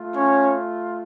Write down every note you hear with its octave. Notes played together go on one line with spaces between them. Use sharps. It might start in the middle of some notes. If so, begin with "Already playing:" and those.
Already playing: A3 F4
C#4 C#5